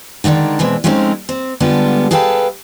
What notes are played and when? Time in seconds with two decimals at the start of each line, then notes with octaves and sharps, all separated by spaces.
0.24 D3 D#3 G#3 C4 D4
0.59 B2 E3 G#3 C4
0.84 F3 G#3 A3 C4 C#4 D#4
1.29 C4
1.60 D3 G3 G#3 B3 F4 A4
2.11 G#4 A4 B4 F5 G5 A5